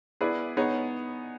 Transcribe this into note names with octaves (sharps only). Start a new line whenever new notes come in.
B3 E4 G#4 B4 D5
B3 D#4 G#4 C#5